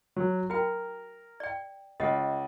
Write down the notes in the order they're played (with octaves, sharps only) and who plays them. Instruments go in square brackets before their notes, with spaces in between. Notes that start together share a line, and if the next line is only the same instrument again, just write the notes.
[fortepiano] F#3
[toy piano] F#4 G5 [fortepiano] A#4
[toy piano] D5 G5
[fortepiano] C#2 [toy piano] D#5 F#5